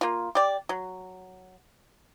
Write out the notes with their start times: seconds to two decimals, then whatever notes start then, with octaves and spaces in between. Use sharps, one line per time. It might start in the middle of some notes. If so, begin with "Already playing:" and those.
0.01 A#3 F4
0.35 G4 D5
0.69 F#3